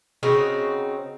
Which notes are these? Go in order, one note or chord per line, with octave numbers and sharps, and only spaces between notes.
C#3 C4 D#4 F#4